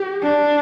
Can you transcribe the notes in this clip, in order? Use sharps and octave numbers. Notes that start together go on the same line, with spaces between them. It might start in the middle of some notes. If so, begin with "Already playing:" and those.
Already playing: G4
D4